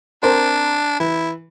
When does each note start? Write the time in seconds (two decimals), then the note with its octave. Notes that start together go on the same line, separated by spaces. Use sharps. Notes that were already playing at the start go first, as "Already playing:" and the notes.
0.23 C4 D4 A#4 C5
1.00 E3 E4